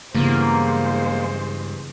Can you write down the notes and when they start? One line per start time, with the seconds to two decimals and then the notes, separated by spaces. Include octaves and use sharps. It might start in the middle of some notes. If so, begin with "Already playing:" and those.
0.15 G2 C#3 E3 G#3 A#3 B3 C5